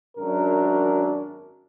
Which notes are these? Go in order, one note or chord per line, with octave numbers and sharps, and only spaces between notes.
G#1 F#2 F#3 D4 A#4